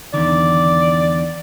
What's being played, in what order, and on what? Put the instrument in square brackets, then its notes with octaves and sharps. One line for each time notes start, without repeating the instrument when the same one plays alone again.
[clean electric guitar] E2 D3 D#3 [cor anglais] D5